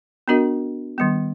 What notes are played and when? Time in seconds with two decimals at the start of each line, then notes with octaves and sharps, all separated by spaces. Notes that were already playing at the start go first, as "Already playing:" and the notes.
0.28 B3 D4 F#4 A#4 D#5
0.98 D#3 G3 B3